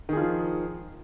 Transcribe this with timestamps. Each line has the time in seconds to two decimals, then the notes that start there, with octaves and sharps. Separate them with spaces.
0.09 D#3
0.13 G#4
0.17 F4
0.21 F3